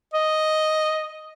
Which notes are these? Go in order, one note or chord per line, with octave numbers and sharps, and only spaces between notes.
D#5